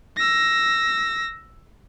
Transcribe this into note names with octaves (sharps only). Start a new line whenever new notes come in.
E6 A#6